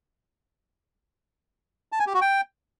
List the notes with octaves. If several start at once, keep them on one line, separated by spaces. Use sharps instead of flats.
A5
G#5
G4
F#4
G5